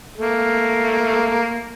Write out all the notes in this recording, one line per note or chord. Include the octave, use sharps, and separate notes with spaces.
A3 A#3